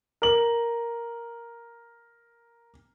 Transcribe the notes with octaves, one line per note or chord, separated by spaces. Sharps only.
A#4 F#7